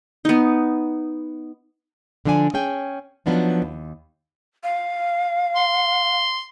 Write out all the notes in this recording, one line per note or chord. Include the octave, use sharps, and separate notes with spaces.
B3 D#4
D3 F3 D4 D5 G#5
C#4 G#4 G5 G#5
F3 F#3 B3 D4 D#4
D#2
F5
C6